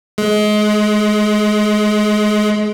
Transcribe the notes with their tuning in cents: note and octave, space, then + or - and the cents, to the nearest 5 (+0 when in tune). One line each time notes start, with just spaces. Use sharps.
G#3 +25